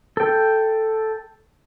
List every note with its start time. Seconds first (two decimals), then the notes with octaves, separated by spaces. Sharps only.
0.17 A4 G5